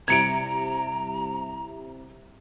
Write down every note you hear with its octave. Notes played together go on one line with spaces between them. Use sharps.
C3 G3 E4 A#5 G#6 C#7 D7